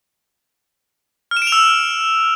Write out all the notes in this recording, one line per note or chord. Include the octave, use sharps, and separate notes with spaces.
F6
E7
D7
F7
E6